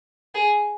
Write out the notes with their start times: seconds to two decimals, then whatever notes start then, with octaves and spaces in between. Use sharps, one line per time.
0.35 G#4